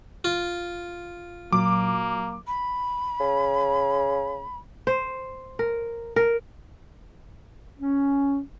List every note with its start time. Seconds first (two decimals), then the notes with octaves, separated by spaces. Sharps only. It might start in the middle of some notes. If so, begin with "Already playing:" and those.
0.24 F4
1.53 A#2 F#3 A#3 D6
2.47 B5
3.20 C#3
4.87 C5
5.59 A#4
6.16 A#4
7.80 C#4